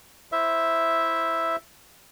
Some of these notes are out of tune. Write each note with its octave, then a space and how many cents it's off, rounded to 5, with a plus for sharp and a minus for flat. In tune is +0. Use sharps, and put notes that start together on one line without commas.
E4 +0 C5 +0 E5 +0